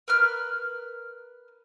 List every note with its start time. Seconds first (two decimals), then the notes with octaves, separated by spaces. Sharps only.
0.08 A#4 B4 F6